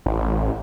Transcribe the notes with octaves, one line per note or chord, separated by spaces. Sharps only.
A1